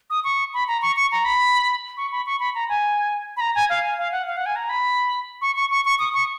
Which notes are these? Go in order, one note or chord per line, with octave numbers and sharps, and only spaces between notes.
D#6
C#6
B5
A#5
C#6
C#6
A#5
B5
C#6
B5
C#6
B5
A#5
G#5
B5
A#5
G#5
F5
G#5
F5
F#5
F5
F#5
G#5
A#5
B5
C#6
C#6
C#6
C#6
D#6
C#6